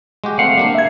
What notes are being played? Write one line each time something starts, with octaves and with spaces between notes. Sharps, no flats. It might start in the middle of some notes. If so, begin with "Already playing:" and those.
G#3 F#4 G4
G#3 A3 C4 F5 F#5
G3 A#3 D4
E5 G#6